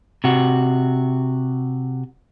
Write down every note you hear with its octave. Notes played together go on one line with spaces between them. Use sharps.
C3 F#4